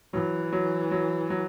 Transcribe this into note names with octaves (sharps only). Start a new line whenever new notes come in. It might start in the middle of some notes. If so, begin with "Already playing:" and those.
E3 F#3
F#3
F#3
F#3